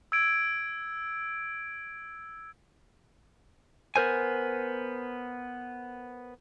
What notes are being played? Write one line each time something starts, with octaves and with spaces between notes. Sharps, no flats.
E6 G#6 D7
B3 A#4 C5 G#5